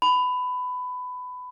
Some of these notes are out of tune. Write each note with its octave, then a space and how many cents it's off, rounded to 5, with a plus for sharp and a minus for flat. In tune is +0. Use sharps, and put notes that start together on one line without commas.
B5 +20